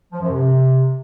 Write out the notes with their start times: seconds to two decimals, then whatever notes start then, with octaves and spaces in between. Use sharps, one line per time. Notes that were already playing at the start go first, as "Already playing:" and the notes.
0.12 F3
0.21 F#2
0.30 C3